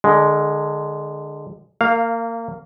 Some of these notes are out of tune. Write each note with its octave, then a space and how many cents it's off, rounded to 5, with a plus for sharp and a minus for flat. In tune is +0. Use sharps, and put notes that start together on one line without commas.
D3 +25 G#3 +0
A#3 -25 F5 +0